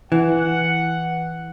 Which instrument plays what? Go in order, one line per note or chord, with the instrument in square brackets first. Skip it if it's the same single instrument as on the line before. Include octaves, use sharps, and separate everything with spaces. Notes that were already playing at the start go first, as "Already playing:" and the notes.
[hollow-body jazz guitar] E3 [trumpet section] F#5